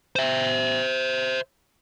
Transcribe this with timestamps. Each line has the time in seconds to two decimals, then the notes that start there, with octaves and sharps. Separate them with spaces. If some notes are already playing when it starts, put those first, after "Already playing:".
0.16 C5 E5